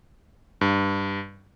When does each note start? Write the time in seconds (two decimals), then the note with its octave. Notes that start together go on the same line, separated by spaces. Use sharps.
0.61 G2